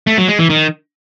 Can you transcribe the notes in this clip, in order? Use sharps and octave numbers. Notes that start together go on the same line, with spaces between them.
A3
F#3
G#3
E3
D#3